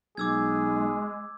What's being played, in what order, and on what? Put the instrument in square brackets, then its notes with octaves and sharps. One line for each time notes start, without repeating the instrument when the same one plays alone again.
[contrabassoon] B1 [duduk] G#3 [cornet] G#4 [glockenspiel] D6 E6 G#6